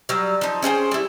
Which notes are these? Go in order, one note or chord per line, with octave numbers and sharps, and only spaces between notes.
F#3 G3
F3 D#4
C#4 G#4 C5 G5
G3 E4